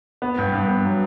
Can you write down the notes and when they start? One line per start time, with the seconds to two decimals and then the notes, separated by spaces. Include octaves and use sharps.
0.22 B3
0.38 G2
0.53 G2
0.68 B3
0.85 F#3